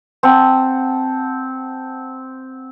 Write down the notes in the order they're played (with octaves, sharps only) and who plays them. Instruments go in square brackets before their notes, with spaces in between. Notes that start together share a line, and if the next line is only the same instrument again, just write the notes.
[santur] C4 F#5 A5